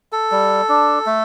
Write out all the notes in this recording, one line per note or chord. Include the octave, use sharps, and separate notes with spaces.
A4
G3
D4
A3